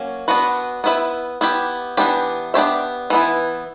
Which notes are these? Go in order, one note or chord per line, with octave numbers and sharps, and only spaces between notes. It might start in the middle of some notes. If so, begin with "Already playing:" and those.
Already playing: F#3 A#3 C#4
B3 D4 F#4 B4
B3 E4 B4 E5
B3 E4 G4
E3 B3 D4 G4
B3 D4 G4 C#5 E5
E3 B3 E4